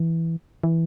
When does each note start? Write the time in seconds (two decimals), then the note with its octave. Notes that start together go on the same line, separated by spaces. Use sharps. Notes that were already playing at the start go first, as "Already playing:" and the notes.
Already playing: E3
0.63 E3